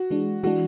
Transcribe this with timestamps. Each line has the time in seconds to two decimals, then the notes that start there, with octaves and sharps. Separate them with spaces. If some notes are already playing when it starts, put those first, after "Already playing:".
Already playing: F#4
0.11 E3 G#3 D4
0.43 E3 G#3 D4 F#4